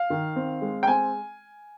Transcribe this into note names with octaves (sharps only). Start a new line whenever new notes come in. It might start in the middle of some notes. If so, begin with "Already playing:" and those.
Already playing: F5
D#3
C4
G#3
G5
C4 G#5